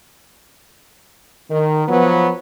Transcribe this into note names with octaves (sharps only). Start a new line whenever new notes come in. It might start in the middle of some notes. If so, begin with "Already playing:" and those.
D#3
F3 F#3 B3